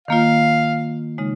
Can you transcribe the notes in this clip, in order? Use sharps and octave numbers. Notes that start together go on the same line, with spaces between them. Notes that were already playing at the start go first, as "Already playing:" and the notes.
D#3 A#3 F4 F5
C#3 G#3 D#4